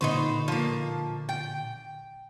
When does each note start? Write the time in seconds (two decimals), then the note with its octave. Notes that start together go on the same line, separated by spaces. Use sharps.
0.01 A#2 D3 D#4 B4 C5 C#6
0.48 F3 A#3
1.29 G5